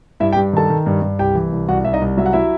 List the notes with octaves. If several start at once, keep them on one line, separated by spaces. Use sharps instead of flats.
G2 E4 E5
G4 G5
G2
D#3 A4 A5
D#3
G2
G2
C2 G4 G5
E3
C2
C2 F#4 F#5
C2 E5
D#4 D#5
C2
F#3 E5
F#5
F#3 E4 E5